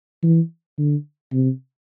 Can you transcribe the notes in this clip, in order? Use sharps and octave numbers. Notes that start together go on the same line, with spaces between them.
E3
D3
C3